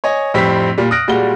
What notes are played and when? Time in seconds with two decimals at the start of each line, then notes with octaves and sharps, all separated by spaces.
0.04 C#5 D#5 G#5
0.34 F2 A2 G3 C4 B6
0.78 A#2 G3
0.91 D#6 F6 F#6 A#6 D7
1.08 A#2 G3 G#3 F#4 G7